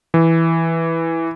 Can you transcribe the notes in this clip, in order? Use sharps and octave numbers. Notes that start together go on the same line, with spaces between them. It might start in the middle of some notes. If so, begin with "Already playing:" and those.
E3